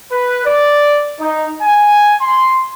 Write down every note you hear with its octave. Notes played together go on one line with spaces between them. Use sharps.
B4
D5
D#4
G#5
C6